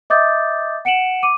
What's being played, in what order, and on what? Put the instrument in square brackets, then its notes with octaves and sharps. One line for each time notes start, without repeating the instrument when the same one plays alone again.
[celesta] D#5 E5 D6 D#6 G6 A6
F#5 C#7 D7 E7 F#7
D6 D#7